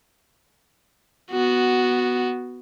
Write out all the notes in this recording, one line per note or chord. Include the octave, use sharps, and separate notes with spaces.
B3 F#4